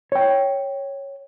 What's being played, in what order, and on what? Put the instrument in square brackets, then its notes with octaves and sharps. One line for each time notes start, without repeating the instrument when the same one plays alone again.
[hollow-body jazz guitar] C#5 G5